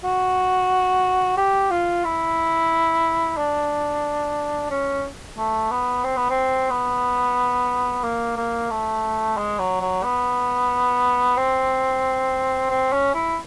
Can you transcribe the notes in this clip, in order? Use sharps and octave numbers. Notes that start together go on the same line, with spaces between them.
F#4
G4
F4
E4
D4
C#4
A3
B3
C4
B3
C4
B3
A#3
A#3
A3
G#3
F#3
F#3
B3
C4
C4
C#4
E4